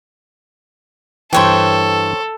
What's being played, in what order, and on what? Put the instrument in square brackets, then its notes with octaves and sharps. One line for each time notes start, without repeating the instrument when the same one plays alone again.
[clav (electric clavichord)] G2 E3 [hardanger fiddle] A4 [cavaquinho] C5 C#5 G5